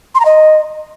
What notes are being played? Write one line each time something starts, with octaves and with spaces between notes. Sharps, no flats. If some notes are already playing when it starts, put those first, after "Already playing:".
C6
A#5
D#5